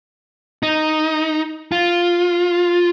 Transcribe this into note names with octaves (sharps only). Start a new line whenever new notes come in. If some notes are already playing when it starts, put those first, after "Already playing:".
D#4
F4